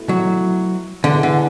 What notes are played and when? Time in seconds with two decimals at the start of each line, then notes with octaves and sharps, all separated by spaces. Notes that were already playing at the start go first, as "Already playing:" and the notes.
Already playing: B2 A3 E4
0.09 F#3
1.04 D3 E3 G#3 B3 D4
1.23 D3